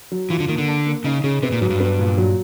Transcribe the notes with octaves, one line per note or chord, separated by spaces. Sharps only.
F#3
E3 F4
D3
D#3 A#3
D3
D4
A#3
C#3 D#4
C#3 G#4
C3 B3
A#2
G#2 F#3
G2
B3
A#2
F#3